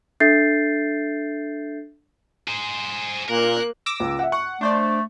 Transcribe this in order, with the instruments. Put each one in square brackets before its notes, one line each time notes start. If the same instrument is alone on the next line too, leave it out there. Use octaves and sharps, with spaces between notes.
[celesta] D4 A4 E5 G6 A6 C7
[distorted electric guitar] G#4 C5
[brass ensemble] A#2 [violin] A#3 F#6 [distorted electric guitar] A#4
[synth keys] D6 E6 A#6
[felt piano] C#2
E5 F#5
[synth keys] F#5 [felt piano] C#6
[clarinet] A3 [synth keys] D4 C5 D5